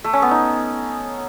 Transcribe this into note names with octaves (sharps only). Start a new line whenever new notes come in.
A3
C#4
B3
D#4